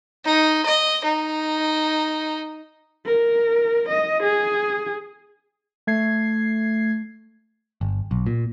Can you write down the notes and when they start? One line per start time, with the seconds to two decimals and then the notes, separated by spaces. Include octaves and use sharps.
0.25 D#4
0.66 D#5
1.04 D#4
3.06 A#4
3.89 D#5
4.23 G#4
5.87 A3 G#6 C7
7.81 G1
8.11 B1
8.26 A#2